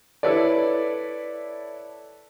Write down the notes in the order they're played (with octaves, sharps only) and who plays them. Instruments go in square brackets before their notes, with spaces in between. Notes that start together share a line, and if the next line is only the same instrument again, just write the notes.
[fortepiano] E4 A4 B4 C#5 D5